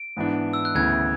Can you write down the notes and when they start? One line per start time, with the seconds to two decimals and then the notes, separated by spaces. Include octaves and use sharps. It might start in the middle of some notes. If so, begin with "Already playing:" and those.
Already playing: D7
0.17 G#2 E3 B3 D4
0.53 E6
0.65 F#6
0.75 D2 C#3 E3 B3 G#6